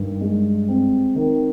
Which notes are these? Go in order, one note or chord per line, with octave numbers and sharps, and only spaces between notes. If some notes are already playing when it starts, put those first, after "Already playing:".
Already playing: G2 D#3
G#3
C4
D#3